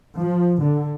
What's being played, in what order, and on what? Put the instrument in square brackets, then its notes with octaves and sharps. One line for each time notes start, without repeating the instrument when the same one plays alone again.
[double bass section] F3
D3